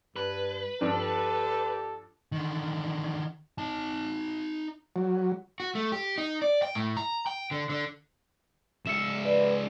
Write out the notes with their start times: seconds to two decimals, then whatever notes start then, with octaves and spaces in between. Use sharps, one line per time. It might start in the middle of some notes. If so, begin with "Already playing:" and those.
0.16 G2 B4
0.81 G2 F3 D4 G4 A4
2.32 D3 D#3
3.58 D#4 A5
4.96 F#3
5.60 F#4
5.75 A3
5.92 G4
6.18 D#4
6.42 D5
6.62 G5
6.75 A2
6.97 A#5
7.27 G5
7.51 D3
7.70 D3
8.86 C#2 E5 C#7 E7
9.25 B4 D5